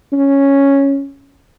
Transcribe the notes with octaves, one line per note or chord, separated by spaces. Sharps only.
C#4